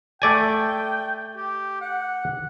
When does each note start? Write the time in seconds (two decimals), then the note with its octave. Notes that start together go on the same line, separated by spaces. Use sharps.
0.22 A3 D5 G5 G#5
1.36 G4
1.81 F#5